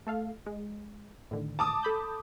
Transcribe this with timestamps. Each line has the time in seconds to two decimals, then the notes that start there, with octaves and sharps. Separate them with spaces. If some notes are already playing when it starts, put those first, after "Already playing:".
0.07 A3 A4 F5
0.46 G#3
1.31 A2 D3 D#3
1.59 A5 D6 D#6
1.83 A4 B5 G6